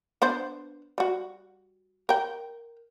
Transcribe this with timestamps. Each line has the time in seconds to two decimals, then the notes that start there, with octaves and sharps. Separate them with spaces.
0.22 B3 D4 C5
0.98 G3 F#4
2.09 A#4 G5